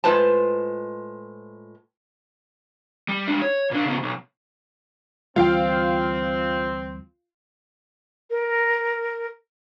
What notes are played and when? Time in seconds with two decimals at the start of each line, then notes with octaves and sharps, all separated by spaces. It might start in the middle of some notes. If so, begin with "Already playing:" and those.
0.04 A2 G#3 F4 B4 C5 A5
3.09 G3
3.27 G#3 D4
3.42 C#5
3.71 A#2 D4
3.85 C#3 B3
4.03 B1
5.36 D2 E3 G3 C4 F4 F5 G5
8.30 A#4